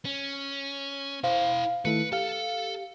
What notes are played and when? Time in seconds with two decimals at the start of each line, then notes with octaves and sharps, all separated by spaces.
0.05 C#4
1.24 E4 C5 F5 G5
1.85 D#3 A3 E4 B4 C#7
2.12 G4 A4 F5